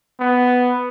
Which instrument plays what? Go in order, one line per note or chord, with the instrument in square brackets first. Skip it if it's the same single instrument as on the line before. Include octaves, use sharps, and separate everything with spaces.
[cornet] B3